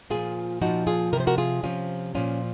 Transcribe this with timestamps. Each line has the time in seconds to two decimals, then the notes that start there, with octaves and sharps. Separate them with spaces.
0.10 A#2 F3 F4 G#4
0.61 A#2 F3 D#4 F#4
0.87 F4 G#4
1.13 C3 A#4
1.17 F3 C5
1.27 F#4 A#4
1.38 F4 G#4
1.63 C3 F3 C#4 F4
2.15 A#2 F3 C#4 F4